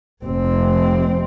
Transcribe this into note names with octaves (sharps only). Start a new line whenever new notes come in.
F1 C4